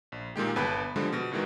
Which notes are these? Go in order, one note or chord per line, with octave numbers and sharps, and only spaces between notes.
A#1
A#2 D#3 G#3 G4
G1 B3 B4 G5 A5 B5
D3 F3 G3 G#3 D4
B2 A#6
G2 B2 D#3 E3 G#3